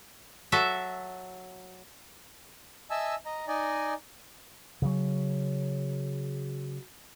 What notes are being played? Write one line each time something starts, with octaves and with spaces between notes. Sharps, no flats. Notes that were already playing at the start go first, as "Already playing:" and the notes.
F#3 F#4 A4 E5
D#5 E5 G#5 A5 E6
D#5 A#5
D#4 D5 D#5 G#5
C#3 F#3